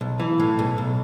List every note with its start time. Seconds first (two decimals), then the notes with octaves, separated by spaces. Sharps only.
0.01 B1
0.20 E3
0.40 A2
0.59 B1
0.78 B1